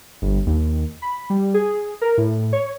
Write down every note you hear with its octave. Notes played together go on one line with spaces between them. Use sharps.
G1
D#2
B5
G3
G#4
A#4
A2
C#5